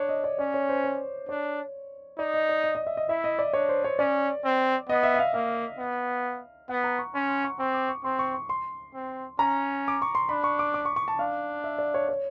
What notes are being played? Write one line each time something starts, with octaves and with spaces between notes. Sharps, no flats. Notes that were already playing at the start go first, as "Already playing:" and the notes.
Already playing: D4 C#5
D#5
D5
C#4 D5
C#5
C5
C#5
D4 C#5
D#4 D5
D#5
D5
D#5
D#5
E5
D#5
E4 E5
D#5
D5
D4 C#5
C5
C#5
C#4 D5
C4
B3 D#5
E5
E5
F5
A#3 F5
B3
B3 F#5
A#5
C#6
C#4 C6
C6
C#6
C4 C#6
D6
C#6
C4 C6
C#6
C#6
C6
C4
C#4 A#5
D6
C#6
C6
D4 B5
C#6
D6
D6
C#6
C#6
A5
D4 F5
E5
D5
C#5
C#5